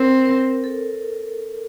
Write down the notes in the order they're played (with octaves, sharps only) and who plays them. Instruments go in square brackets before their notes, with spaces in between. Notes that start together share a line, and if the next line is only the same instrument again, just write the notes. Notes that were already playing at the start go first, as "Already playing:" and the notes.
Already playing: [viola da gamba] C4 [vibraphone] A#4
[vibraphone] A#4
A4